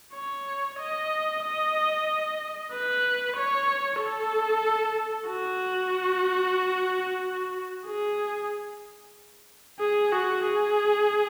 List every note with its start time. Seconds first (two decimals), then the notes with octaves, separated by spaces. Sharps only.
0.14 C#5
0.79 D#5
1.43 D#5
2.72 B4
3.36 C#5
4.01 A4
5.29 F#4
7.87 G#4
9.80 G#4
10.12 F#4
10.44 G#4